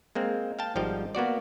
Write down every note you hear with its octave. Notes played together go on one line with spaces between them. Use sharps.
G#3 A#3 C4
F5 G5 A5
G#1 F3 G3 D#4 F5 G5
A#3 B3 F#4 D5